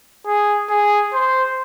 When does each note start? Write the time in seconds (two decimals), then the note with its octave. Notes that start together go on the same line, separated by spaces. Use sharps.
0.27 G#4
0.70 G#4
1.13 C5